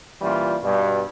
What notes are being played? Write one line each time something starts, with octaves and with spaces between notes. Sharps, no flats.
A#2 E3 G3 C#4 F4
G2 B2